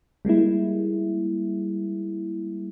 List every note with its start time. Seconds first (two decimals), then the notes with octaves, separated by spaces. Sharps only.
0.25 G3 G#3 A#3 E4